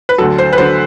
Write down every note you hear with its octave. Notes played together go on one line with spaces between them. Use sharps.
B4
D2 D3 F#3 A4
C5
B4
D3 F#3 C5